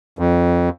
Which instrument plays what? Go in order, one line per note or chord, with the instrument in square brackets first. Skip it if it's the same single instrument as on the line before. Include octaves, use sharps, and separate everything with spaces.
[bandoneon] F2